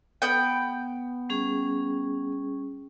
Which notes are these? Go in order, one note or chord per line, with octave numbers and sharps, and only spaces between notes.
B3 G5
G3 C#4 G#4